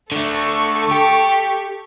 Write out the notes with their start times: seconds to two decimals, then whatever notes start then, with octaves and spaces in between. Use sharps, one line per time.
0.12 D3 A3 A4 C#6
0.91 G4